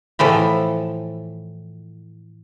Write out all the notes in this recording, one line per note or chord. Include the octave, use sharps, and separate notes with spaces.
A2 E3 F3 A4